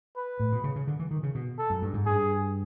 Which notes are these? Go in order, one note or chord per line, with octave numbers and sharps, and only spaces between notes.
B4
A2
B2
C#3
C#3
D3
E3
D#3
C#3
B2
A4
F#2
G2
G#2
G2 G#4